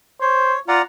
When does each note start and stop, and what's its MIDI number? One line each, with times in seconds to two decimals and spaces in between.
0.21 0.54 72
0.21 0.60 73
0.68 0.81 65
0.68 0.82 74
0.68 0.82 78
0.68 0.82 82